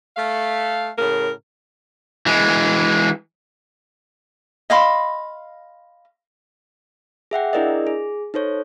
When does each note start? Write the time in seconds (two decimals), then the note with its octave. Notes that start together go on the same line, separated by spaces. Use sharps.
0.16 A3 F5
0.97 A2 C#3 A#4
2.26 E3 G#3
4.70 D#5 F5 B5 C6
7.31 G#4 E5 F#5 G5
7.53 D4 E4 G#4 A#4 D5 D#5
7.87 G#4
8.34 D#4 A4 C5 C#5